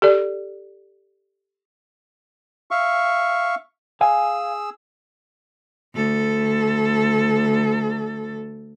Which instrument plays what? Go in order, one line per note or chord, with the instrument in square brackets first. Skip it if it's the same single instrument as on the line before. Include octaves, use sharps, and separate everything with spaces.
[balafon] G4 A4 D5
[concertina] E5 F5 C#6
[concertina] G#4 E6 [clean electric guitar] F5 G#5
[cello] D2 A4